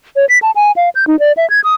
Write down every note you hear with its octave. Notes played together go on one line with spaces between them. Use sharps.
C#5
B6
A5
G#5
F5
G6
D#4
D5
E5
G#6
D#6